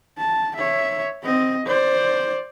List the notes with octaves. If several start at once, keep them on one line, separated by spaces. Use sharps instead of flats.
A5
C#5 E5
C4 D#5
C5 D5